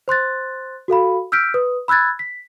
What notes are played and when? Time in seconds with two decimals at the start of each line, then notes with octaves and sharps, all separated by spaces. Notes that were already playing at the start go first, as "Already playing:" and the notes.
0.08 C5 C6 F#6 A6
0.88 F#4 A4 F5 B5
1.32 E6 F6 G6 B6 D7
1.54 B4 D#6
1.88 B5 E6 F#6 G#6 A6
2.19 B6